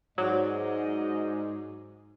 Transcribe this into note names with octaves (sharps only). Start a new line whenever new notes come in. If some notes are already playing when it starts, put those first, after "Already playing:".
G#2 F#3 F#4 G#4 D5 D#5 D6